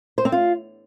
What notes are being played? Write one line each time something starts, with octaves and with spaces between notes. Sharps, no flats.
C5
C4
F4